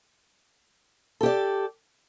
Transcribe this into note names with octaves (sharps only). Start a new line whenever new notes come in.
G4 A4 D5